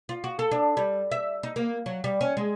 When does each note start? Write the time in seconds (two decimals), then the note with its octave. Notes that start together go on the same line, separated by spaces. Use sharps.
0.09 F4
0.24 F#4
0.39 A4
0.51 D4
0.77 G3
1.11 E5
1.43 D#4
1.56 A#3
1.86 F#3
2.04 G3
2.21 C#4
2.37 G#3